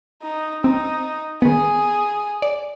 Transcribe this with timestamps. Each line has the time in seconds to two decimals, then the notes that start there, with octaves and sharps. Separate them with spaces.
0.23 D#4
0.64 C4 D#4
1.42 D#3 B3 G#4
2.42 D5